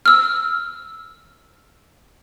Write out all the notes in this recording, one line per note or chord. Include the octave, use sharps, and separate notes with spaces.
E6 F6